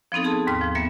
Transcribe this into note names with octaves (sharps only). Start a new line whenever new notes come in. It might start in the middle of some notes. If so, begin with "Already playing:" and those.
F3 B3 C4 D#4 A4
D#4 G#4 A5 C6
D#2 G#2 F6
F3
G3 A#3 B3 E5